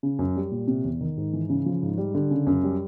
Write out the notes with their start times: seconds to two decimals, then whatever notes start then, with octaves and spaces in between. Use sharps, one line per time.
0.03 C#3
0.19 F#2
0.36 G3
0.51 A#2
0.68 C3
0.84 E2
1.01 D#3
1.17 G#2
1.33 E3
1.49 C#3
1.66 F3
1.82 G#2
1.98 G3
2.15 D3
2.31 C#3
2.47 F#2
2.63 G3